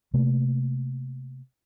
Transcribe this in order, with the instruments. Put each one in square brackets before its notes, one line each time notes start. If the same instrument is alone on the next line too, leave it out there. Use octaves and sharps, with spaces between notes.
[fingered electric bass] C3 A3 A#3